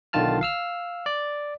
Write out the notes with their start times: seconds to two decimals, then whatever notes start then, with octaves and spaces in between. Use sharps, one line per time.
0.13 B1 D3 D#3 F4 A5 F6
0.41 F5 E6 F6
1.06 D5